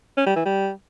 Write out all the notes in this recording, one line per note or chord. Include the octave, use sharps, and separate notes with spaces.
C#4
G3
E3
G3